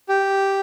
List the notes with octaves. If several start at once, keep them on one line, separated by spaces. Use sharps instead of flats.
G4